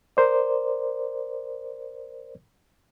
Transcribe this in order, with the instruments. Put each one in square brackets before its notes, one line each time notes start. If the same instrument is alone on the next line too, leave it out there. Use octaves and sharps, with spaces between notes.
[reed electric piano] A#4 C5 D5